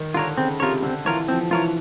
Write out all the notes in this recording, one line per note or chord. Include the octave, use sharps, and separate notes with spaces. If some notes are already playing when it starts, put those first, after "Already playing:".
Already playing: D#3
D3 F4 A#4 C#5
C#3 C4
C3 F4 A#4 C#5
D3 C4
E3 F4 A#4 C#5
F3 C4
E3 F4 A#4 C#5